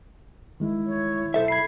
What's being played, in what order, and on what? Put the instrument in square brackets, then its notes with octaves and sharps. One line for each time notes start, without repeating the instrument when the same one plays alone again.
[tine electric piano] D#3 G#3 [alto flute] E4
[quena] C#5
[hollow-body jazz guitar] B1 A4 E5 [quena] C5
[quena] B5 [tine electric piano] G#6 C7